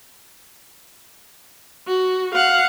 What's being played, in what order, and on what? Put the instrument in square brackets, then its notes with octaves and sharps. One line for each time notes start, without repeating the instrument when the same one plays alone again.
[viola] F#4
F5 F#5